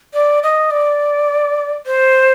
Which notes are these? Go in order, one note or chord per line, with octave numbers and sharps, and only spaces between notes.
D5
D#5
D5
C5